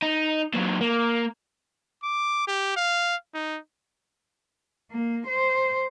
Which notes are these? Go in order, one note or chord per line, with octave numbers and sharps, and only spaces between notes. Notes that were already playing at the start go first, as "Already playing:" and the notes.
D#4
A#2 F#3
A#3
D6
G4
F5
D#4
A#3
C5